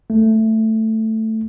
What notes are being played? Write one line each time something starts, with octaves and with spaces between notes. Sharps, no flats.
A3